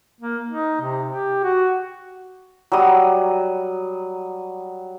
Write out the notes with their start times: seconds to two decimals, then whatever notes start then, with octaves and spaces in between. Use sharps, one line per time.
0.21 A#3
0.48 D#4
0.81 C3
1.07 G4
1.44 F#4
2.72 F#3 G3 D#6